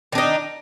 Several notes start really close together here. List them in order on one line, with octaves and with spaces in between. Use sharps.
D#3 D4 D#4